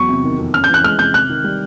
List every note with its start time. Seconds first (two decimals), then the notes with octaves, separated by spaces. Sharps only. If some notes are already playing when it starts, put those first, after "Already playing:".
Already playing: E2 F#3 C#6
0.09 C3
0.24 D#3
0.39 F2
0.54 C#4 F6
0.64 G6
0.69 E3
0.74 F#6
0.84 G#3 F6
0.99 C3 G6
1.14 C3 F#6
1.29 D#3
1.44 G3